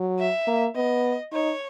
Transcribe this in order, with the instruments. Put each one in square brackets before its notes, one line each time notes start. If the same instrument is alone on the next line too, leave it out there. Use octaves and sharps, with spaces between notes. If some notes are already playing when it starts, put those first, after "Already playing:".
Already playing: [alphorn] F#3
[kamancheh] E5
[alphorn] A#3
[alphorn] B3 [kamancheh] D#5
[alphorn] D#4 [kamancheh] C#5